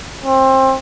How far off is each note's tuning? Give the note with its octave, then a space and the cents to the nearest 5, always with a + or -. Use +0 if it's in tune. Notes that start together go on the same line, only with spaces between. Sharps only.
C4 +25